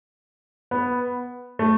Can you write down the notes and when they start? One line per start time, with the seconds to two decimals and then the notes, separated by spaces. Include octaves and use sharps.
0.71 B3
1.59 A3